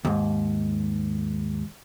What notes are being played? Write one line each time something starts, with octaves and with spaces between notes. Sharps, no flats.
D#2 G#2